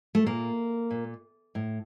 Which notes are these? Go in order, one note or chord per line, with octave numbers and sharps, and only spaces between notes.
A3
A#2 A#3
A#2
A2